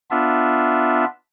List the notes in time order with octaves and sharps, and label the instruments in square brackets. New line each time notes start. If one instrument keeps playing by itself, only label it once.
[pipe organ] B3 D4 F4 E5